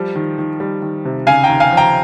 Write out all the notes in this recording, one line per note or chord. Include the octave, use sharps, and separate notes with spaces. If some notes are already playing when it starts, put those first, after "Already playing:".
Already playing: F3 G3
D#3
D#3
G3
D#3
C3
C#3 F5 G#5
G5 A#5
D#2
F5 G#5
F3
G5 A#5